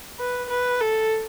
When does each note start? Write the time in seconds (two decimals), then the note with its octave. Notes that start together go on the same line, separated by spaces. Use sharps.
0.19 B4
0.50 B4
0.81 A4